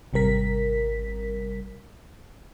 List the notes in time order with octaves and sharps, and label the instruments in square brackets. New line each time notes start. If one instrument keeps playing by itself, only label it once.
[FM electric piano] G#1 C3 G3 A#4 B6